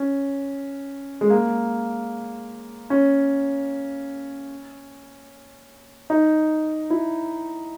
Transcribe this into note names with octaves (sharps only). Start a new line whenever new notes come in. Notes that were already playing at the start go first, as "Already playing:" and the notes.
Already playing: C#4
G#3
A#3
C#4
D#4
E4